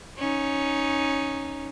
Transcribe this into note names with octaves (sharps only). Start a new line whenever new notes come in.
C#4 D#4